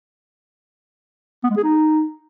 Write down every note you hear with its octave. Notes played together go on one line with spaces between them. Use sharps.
B3
G#3
G#4
D#4